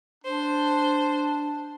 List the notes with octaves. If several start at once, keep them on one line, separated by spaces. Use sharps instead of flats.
D4 C5